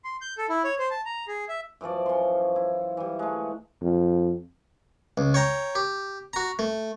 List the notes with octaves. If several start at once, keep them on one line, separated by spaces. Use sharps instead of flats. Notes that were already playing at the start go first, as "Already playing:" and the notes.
C6
G6
A4
E4
C#5
C5
A5
A#5
G#4
E5
F#2 E3 F3 D5
C#4 C6
E4
E3 G3
G#3 A3
F2
C#2
C#5 G5 A#5
G4
F#4 A#5
A3